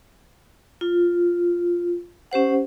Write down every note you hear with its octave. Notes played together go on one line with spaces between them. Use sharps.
F4
C#4 G4 C5 F#5